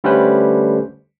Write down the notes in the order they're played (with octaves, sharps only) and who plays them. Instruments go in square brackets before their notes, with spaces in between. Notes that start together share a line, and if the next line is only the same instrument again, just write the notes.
[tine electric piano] D3 G3 A3 C#4 B4 C5